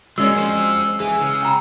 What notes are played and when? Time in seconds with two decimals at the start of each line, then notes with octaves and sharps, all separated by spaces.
0.18 D#3 G#3 A#3 C#4 F#4 D5 D#5 E6
0.35 F3 C4
1.00 E3 G#4
1.21 C#3
1.43 G5 A#5 B5